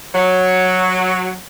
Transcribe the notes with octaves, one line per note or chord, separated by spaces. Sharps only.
F#3